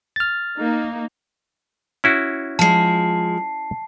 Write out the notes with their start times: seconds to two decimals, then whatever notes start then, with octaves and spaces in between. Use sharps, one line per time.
0.16 F6 A6
0.57 A#3 D#4
2.04 C#4 E4 F#4
2.59 F3 G#3 A5 C7